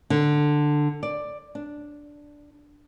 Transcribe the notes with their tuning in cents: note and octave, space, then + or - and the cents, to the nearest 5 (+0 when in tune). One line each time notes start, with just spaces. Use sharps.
D3 +10
D5 +10
D4 +0